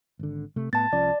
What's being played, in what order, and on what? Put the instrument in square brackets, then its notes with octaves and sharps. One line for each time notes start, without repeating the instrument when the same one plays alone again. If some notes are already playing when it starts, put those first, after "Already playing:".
[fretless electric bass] G#1 D3
C3 A3
[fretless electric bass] A2 B3 [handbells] A5 A6
[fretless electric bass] C2 F3 C#4 [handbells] D5